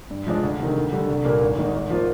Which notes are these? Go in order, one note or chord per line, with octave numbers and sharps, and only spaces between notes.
G2
F3 G#3 D4
D2
C3 D#3
D2
D3 G3
C2
A#2 G3 A#3 D4
G#1
G#2 D#3 A#3
G#2
F3 A#3 F4 C5